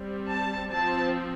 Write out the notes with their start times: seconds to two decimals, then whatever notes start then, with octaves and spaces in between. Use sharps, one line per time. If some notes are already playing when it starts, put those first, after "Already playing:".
Already playing: G3 C4
0.29 A5
0.70 F3 C4 A5